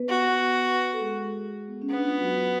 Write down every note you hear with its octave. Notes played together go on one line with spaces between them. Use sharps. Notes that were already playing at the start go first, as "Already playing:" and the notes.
Already playing: B3 B4
F#4
A4
G#3 G#4
B3
C#4
B3 D4
F4
F#3 F#4